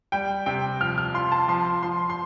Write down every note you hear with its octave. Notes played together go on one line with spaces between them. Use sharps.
G3 G5
C3 G5
F3 F6
F6
F4 C6
A5
F3 C6
F3 C6
C6